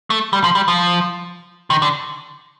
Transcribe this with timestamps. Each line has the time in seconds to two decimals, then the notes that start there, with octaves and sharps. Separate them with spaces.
0.10 A3
0.33 G3
0.44 F3
0.55 G3
0.68 F3
1.70 D#3
1.82 D3